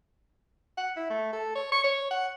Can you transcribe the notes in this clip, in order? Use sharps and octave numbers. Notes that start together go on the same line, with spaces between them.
F#5
E4
A3
A4
C#5
C#6
C#5
F#5